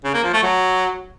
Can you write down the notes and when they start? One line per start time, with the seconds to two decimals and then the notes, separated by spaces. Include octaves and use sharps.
0.04 C#3
0.14 A#3
0.24 F3
0.33 A3
0.43 F#3